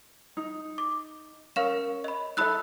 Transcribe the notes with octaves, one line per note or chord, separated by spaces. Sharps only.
D#4
D6
C#4 A#4 F5 E7
D#5 B5
D#4 A4 E5 B5 E6 F#6